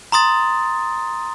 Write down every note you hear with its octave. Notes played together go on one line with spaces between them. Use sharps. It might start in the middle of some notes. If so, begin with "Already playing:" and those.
A#5 C6 D#6 A6